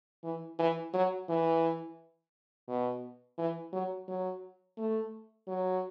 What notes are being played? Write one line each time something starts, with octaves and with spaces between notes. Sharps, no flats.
E3
E3
F#3
E3
B2
E3
F#3
F#3
A3
F#3